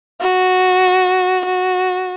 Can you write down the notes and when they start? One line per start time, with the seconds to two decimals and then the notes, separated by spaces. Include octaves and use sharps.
0.21 F#4
1.45 F#4